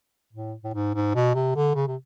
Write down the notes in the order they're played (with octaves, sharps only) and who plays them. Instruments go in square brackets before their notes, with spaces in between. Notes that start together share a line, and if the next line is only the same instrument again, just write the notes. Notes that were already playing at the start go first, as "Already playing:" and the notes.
[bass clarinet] A2
A2
G#2
G#2
B2
C3
D3
C#3
C3